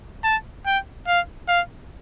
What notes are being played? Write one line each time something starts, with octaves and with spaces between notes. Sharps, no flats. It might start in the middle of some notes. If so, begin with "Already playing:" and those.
A5
G5
F5
F5